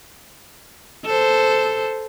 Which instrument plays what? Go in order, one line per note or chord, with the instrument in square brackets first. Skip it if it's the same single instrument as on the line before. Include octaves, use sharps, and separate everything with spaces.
[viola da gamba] A4 C5